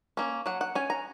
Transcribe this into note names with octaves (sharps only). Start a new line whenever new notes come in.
A#3 C#4
F#3 F#5
F#5
C#4 G#5
A#5